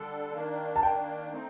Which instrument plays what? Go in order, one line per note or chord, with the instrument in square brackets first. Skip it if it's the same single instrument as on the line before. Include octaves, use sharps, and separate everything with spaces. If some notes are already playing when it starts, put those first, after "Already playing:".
Already playing: [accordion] D3 G3 D4 A4
D#3 A#3 D4
[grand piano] A5
[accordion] D#3 A#3 D4 [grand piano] G5
[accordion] A3 C4 D#4